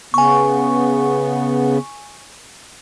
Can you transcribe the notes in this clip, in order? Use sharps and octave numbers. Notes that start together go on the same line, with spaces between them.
C#3 B3 G#5 C#6